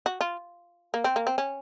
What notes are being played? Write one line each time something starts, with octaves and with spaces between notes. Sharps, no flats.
F#4
F4
A#3
C4
A#3
C4
C#4